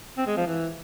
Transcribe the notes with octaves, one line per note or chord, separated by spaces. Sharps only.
C4
G#3
F3
E3